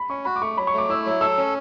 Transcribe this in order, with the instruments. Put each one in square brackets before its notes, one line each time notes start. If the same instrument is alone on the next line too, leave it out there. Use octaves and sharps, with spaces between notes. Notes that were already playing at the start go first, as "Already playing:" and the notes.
Already playing: [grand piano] B5
[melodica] C#4 [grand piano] C#6
[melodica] F#4 [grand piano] B5
[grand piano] D6
[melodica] A3 [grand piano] C#6
[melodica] F#3 [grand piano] B5
[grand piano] C#6
[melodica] A3 [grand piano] D6
[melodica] E4 [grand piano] E6
[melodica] F#3
[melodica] A4 [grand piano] E6
[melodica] C#4